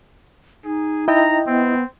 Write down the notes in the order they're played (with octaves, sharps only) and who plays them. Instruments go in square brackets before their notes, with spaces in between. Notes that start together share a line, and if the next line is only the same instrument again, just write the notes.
[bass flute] D#4 [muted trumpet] G#4
[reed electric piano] E4 D#5 G5 [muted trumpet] A#5
[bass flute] B3 [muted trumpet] C4